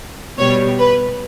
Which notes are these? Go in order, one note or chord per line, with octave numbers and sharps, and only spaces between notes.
B2 G3 C#5
B4